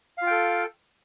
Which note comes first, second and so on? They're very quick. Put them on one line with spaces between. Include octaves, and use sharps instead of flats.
F5 F4 G5 A4